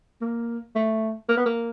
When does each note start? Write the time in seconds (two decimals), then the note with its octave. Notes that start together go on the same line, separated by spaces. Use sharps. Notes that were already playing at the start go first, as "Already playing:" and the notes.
0.21 A#3
0.75 A3
1.29 A#3
1.37 B3
1.46 A#3